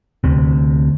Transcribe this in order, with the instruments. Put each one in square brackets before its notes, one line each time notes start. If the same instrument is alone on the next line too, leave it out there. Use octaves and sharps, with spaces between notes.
[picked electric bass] D2 C3